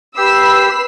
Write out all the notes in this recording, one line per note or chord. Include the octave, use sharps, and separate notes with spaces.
G4 B4 B5 E6 B6 C7